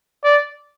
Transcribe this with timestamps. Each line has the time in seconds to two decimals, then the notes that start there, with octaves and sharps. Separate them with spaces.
0.24 D5